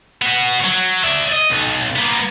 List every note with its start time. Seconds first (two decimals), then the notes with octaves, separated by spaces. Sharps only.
0.22 B3 F#4
0.64 F#3
1.04 D5 E5
1.32 D#5
1.50 B1
1.96 A#3 B3